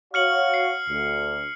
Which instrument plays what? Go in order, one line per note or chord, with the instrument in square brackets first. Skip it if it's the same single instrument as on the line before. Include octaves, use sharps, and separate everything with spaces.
[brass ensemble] F#4 C#5 F5 [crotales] F6 C#7 F#7
[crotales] C7
[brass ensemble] D2